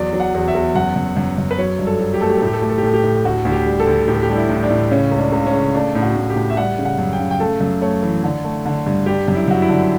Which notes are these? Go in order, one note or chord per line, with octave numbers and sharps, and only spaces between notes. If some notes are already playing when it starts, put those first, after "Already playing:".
Already playing: E2 F#3 D5
F#3
F#5
E2
E5
E2
F#2 F#5
F#2
F#2
F#2
B4
F#3 C#5
G2
A4
F#3
G4
A3 A4
G4
A4
A2 G4
A4
A3 G4
A4
G4
A2 A4
G4
A2
D2 F#4
D2
G4
G3
A4
D2
A2 G4
A4
G4
G3 D4
E4
A2
D4
A2
C#3 C#4
C#2
D4
C#2
C#4
C#3
A3 D4
A2
F#4
A2
G4
A2
E5
G3 F#5
C#3
F#5
F#2
G5
C#3
G5
A3 A4
F#2
A3 C#5
E3
D3
A3
D3
G2
G3 G4
F#2
E4
F#2 F#4
E4
D3